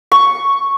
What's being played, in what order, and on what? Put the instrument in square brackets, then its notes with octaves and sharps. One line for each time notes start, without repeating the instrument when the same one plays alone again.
[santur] C#6